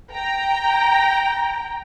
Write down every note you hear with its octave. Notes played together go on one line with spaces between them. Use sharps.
G5 A#5